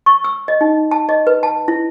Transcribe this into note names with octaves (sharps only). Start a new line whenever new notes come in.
C#6
E6
D#5
D#4
A5
D#5
B4
A5
E4